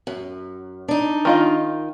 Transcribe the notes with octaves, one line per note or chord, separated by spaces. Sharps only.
F#2
D4 D#4
D#3 F4 D#5